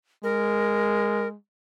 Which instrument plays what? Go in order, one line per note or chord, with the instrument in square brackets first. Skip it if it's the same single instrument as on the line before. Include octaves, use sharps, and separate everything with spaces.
[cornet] G#3 [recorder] A#4